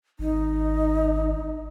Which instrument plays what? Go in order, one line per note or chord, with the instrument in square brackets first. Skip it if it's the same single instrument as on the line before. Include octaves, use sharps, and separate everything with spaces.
[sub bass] G#1 [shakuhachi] D#4